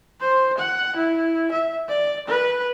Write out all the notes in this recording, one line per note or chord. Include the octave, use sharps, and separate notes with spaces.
C5
F#5
E4
E5
D5
B4